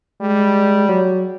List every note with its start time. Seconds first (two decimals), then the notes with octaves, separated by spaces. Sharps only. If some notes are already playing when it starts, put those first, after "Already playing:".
0.21 G3 G#3
0.89 F#3